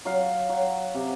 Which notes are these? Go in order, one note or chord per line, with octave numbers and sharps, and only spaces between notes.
F#3 F5
F#3
C3